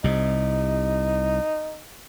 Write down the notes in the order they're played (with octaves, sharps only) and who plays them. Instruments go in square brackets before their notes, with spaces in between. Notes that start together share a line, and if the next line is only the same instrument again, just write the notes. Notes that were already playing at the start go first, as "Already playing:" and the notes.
[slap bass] C2 C3 [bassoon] D#4